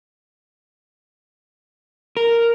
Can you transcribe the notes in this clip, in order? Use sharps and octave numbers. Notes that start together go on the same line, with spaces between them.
A#4